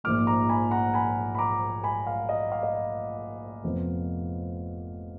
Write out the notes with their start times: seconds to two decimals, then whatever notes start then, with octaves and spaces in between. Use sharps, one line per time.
0.04 A#1 G#2 F3 A#3 D6 F6
0.27 A#5 D6
0.49 G#5 B5
0.71 F#5 A#5
0.94 G#5 B5
1.35 B5
1.39 A#5 D6
1.83 G#5 B5
2.07 F5
2.29 D#5
2.52 F5
2.63 D#5
2.74 F5
3.64 F1 F2 F3 B3